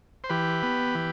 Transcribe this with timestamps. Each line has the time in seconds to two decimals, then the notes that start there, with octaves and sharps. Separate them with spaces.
0.24 C5
0.29 E3 G4 B4
0.63 B3
0.95 E3